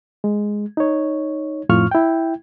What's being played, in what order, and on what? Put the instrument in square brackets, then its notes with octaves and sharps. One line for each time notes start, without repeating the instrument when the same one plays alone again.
[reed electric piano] G#3
D#4 C#5
F2 A2 F4 C#6 F6
E4 G5